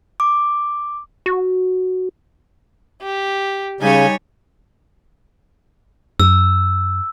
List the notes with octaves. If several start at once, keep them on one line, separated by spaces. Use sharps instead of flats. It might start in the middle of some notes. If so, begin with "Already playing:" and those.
D6
F#4
G4
C#3 G3 D#4 C#5 G#5
F#2 E6